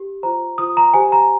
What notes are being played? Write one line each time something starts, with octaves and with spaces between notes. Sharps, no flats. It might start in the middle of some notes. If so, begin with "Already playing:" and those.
Already playing: G4
F4 C5 A#5
F4 C5 D#6
A#5
G4 C5 G#5
A#5